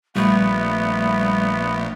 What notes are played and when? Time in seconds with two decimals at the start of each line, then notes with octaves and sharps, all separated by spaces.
0.16 A#1 G3 A3 B3